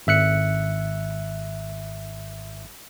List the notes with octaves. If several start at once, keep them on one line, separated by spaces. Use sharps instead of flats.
G#1 E5 F#6 C#7